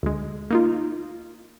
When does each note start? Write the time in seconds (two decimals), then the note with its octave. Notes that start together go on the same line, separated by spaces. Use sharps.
0.03 D2 G#3
0.50 A#3 D#4 F4